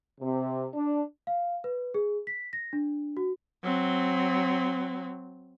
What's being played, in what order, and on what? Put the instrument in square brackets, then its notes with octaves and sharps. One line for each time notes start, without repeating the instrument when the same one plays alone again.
[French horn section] C3
D4
[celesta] F5
B4
G#4
B6
A#6
D4
F#4
[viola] F#3 C4